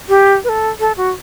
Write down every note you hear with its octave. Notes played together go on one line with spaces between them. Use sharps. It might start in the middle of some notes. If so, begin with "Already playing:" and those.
G4
B4
A4
A4
F#4